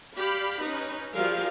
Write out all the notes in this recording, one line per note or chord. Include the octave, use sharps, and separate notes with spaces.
G4 D5 F5 B5
C#4 D#4 B4
F3 G3 F#4 G#4 A#4 F5